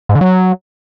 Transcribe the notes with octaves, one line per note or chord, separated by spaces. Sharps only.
G#2
D3
F#3